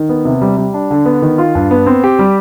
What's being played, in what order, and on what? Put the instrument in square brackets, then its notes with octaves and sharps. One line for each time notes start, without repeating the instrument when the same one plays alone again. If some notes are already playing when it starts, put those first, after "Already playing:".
Already playing: [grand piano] D#3
B3
C3
G3
G3
D4
D3
B3
D#3
F4
G2
B3
C4
G4
G3